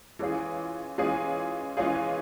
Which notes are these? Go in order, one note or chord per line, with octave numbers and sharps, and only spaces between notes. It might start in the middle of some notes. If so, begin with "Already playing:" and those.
E3 G#3 C#4 F4 G#4
E3 G#3 C#4 F4 G#4
E3 G#3 C#4 F4 G#4